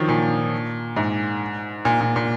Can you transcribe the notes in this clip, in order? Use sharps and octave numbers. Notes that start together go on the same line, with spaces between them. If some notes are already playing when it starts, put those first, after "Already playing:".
Already playing: D#3 F3 F#3
A#2
G#2
A#2
A#2
A#2